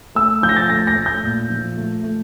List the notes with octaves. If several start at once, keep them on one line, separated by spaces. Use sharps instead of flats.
A3 E6
F3 G6
A#6
A6
A3 A#6
A#6
A3
G6
A#2
F3
A3
A3